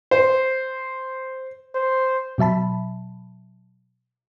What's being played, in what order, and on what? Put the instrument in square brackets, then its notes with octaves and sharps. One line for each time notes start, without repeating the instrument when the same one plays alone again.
[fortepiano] C5
[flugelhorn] C5
[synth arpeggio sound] B2 F#3 E5 A5 B5